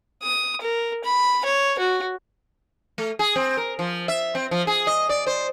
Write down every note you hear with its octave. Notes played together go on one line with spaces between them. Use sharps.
D#6
A#4
B5
C#5
F#4
A3
G#4
C4
A#4
F3
E5
C4
F3
G#4
D#5
D5
C5